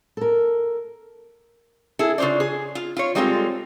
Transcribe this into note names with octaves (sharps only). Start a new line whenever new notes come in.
A4 A#4
E4 G#4 A4
C#3 D4 F4 C5 D5
G#4
F4
F4 C#5
G3 G#3 C4 F4 G#4 A4